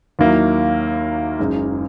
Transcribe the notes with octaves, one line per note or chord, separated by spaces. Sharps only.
D#2 D#3 F#3 A#3 E4
F#1 F#2 C#3 G#3 D#4